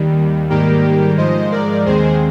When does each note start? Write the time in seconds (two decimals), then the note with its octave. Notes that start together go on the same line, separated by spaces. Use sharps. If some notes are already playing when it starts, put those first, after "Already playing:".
Already playing: D#2 D#3 G3
0.50 G#2 D#3 G3 A#3 G4 A#4
1.17 G#2 F3 G#3 C5 D#5
1.51 A#4 D5
1.85 D#2 D#3 G#3 C4 G#4 C5